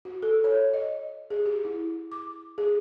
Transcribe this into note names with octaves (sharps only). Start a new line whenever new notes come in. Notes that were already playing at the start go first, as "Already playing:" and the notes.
F#4
A4
C#5
D#5
G#4
G4
E4
D6
G#4